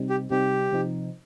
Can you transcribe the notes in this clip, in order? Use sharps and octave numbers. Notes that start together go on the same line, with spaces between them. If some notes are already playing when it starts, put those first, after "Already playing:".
Already playing: C3 G3 C4 D#4
G4
C3 G3 C4 D#4 G4
C3 F3 C4 D#4